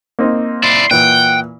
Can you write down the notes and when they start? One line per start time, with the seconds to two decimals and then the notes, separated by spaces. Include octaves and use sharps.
0.19 A#3 C4 D#4
0.63 E4 D5 C6
0.91 A#2 E3 F#5 G5